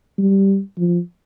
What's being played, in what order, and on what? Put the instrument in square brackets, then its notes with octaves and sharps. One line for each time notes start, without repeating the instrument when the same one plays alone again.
[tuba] G3
F3